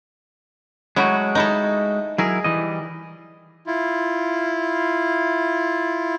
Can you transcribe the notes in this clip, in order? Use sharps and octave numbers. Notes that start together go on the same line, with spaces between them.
F#3 G#3 A3 E4 F#4
D#4 E4 A4
F#3 E4 G#4 A#4
E3 G3 D#5
E4 F4